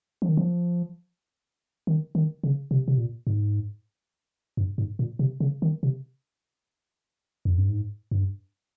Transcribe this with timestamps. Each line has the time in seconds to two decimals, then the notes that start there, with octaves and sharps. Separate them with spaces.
0.22 F3
0.29 D#3
0.37 F3
1.87 D#3
2.15 D#3
2.44 C#3
2.71 C3
2.88 C3
2.98 A#2
3.27 G#2
4.57 G2
4.78 G#2
4.99 A#2
5.19 C3
5.40 C#3
5.62 D#3
5.83 C3
7.45 F2
7.58 G2
7.69 G#2
8.11 G2